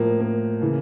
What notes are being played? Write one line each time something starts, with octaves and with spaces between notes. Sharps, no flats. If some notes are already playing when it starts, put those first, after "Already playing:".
Already playing: A2 F3 A#3
A#3
C#3 E3